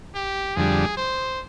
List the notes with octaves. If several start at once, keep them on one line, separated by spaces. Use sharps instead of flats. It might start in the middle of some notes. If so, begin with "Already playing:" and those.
G4
F2 D3 G3 G#4
C5